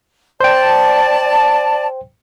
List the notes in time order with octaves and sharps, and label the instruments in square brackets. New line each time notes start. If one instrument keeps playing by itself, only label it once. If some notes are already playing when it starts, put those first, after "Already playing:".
[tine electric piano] C5 G5 [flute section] D5 A5